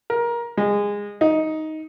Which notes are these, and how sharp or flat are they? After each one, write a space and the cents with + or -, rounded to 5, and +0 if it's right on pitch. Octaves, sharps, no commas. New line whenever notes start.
A#4 +20
G#3 -20
D#4 +10